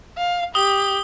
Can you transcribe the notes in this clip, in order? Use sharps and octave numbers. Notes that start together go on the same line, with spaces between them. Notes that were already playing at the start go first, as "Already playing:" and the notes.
F5
G4 D#6 G7